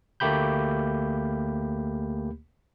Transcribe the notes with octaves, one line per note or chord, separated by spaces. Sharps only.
D2 A3 A#3 G4 B5 G6